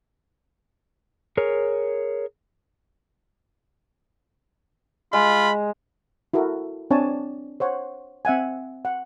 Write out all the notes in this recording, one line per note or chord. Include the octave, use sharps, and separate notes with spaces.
G#4 A#4 C#5
G#3 F4 B5
E4 F#4 A4 A#4
C4 D4 C#5 G#5 A5
C5 C#5 F#5
C4 E5 F#5 G#5
F#5